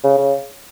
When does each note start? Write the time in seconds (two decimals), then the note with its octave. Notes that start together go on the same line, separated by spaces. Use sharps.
0.04 C#3
0.18 C#3